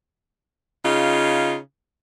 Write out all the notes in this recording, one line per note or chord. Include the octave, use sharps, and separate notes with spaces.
C#3 D#4 F4